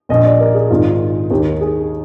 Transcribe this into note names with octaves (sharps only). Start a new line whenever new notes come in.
A#1 A#2 D#5
D5
A#4
G#4
G#1 G#2 D#3 F4
D#2 D#3 G4
G#4